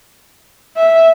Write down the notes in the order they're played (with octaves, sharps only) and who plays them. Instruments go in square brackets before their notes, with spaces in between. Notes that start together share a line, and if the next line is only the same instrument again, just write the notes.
[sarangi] E5